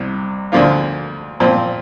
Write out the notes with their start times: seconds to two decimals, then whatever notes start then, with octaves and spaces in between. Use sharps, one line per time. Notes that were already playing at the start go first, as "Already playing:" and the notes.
Already playing: C2 C3
0.52 D2 D3 F3 A#3 F4
1.40 A#2 F3 C4